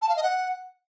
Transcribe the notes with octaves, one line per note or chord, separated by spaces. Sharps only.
A5
F5
D#5
F#5